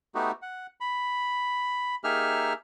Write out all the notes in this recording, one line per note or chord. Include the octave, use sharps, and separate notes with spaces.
A3 B3 D#4 F#4 G4
F#5
B5
A#3 D#4 G4 G#4 E5 F6